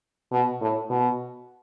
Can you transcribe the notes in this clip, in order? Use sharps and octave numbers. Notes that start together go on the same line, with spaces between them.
B2
A2
B2